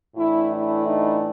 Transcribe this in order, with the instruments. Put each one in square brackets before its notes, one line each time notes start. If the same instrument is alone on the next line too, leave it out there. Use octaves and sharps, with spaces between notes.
[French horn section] A2 E3 A3 D4 E4
E4
D#4